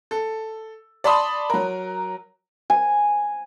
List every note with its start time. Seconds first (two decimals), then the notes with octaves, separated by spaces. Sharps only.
0.11 A4
1.04 D5 A5 B5 C6 D#6
1.50 F#3 A#4
2.70 G#5